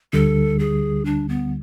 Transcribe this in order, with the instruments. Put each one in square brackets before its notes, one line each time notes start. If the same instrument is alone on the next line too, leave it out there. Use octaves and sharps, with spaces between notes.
[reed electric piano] D2 D3 G3 [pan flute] A4
[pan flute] G#4
D4
B3